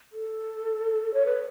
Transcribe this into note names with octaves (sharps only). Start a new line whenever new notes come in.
A4
C#5
B4